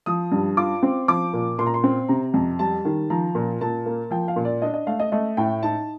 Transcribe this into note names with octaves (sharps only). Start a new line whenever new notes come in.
F3 D#6
G2
F4 D6
C4
F3 D6
A#2
A#2 C6
A#5
C6
C4
C3 A#5
F2
G3 A5
D#3
F3 A#5
A#2
A#2 A5
A#3
F3 G5
F5
A#2
D5
D4 D#5
D#5
A3 F5
D#5
A3 D#5
A2 G5
D#4 A5